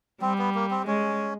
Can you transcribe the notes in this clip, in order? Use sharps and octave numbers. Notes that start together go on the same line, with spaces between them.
G3 C4
B3
A#3
C4
G#3 C#4